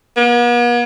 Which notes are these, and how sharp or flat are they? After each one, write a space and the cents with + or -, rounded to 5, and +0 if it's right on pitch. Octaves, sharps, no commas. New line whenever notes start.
B3 -45